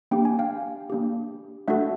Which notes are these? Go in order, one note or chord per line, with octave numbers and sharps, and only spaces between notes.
A#3 D4 G4 G5
G#5
F5 G5
A#3 D4 G4
A3 D4 F#4 A4 E5 F#5